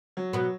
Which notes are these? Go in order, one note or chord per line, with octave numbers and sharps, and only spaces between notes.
F#3
B2 B3